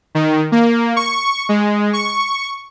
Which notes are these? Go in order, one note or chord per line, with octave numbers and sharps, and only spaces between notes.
D#3
A#3
C#6
G#3
C#6